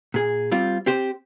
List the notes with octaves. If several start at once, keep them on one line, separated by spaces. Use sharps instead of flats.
A#2 G#4
G3 C4 F4
C4 G4 C5